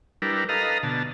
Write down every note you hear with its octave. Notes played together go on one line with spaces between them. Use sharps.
G3 D4 E4 A#4 B4
A4 B4 D#5 F5 A#5
B2 D3 A5